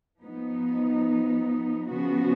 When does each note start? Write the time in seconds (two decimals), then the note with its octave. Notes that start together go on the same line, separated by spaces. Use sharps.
0.22 F3 B3 D#4
1.89 C#3 F3 B3 F#4